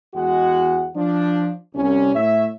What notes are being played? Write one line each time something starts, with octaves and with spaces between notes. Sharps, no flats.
E2 G#3 F#4 F#5
F3 D4
C2 C#4
A2 C#5 E5